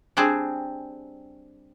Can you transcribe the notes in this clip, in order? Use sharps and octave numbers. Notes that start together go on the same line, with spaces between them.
G3 C4 D4 G#4